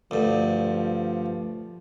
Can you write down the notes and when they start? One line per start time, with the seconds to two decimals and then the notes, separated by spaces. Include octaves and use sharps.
0.11 D2 G2 F3